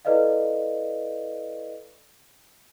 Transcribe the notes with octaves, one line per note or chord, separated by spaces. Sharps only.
E4 A4 B4 D5 D#5 F5